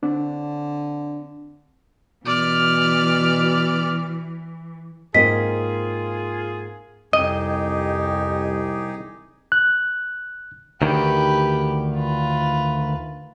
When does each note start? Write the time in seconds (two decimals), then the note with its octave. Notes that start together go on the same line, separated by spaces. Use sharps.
0.03 D3 C4 D4
2.25 B2 E3 D5 F6
5.14 G#2 A#3 C4 F4 G#4 D#5 B6
7.13 C2 F2 D#4 G4 G#4 D#5
9.52 F#6
10.82 D2 D#3 G4 B4
11.94 F4 B4